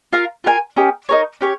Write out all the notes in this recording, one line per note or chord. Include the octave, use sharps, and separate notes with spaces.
F4 A#4 F5
F4 A#4 F5 G#5
C#4 G4 A#4 D#5
D#4 A#4 C#5
C#4 G4 C#5